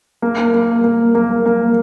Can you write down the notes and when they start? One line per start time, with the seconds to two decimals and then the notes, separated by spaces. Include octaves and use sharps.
0.22 A#3
0.54 A#3
0.84 A#3
1.15 A#3
1.46 A#3